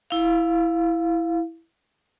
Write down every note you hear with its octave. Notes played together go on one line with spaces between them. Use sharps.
E4 F5